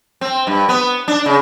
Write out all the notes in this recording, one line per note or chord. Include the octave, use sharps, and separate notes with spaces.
C4
G2
B3
D4
C#3